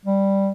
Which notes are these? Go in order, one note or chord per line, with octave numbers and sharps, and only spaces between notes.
G3